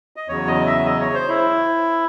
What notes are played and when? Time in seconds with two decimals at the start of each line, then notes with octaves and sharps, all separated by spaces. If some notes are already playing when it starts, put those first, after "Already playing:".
0.16 D#5
0.28 E2 C#3 F#3 C#5
0.47 D#5
0.66 E5
0.86 D#5
1.00 C#5
1.14 C5
1.29 E4